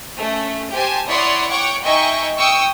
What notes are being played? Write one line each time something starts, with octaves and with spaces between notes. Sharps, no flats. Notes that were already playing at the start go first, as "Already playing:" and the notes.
A3 C#4
G4 C5 G#5 A5
E4 C#5 D5 F#5 C6 D#6
C#5 F#5 G5 C#6 D6
D#4 D#5 E5 G5 G#5 C#6
G5 C#6 D#6 E6